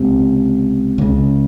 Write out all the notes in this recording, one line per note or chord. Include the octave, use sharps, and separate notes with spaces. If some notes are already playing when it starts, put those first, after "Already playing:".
Already playing: C#2 C3
C#2 C#3